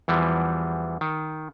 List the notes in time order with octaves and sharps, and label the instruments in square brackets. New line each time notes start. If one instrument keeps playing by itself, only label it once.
[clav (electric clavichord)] E2 E3 F3 G3
D#3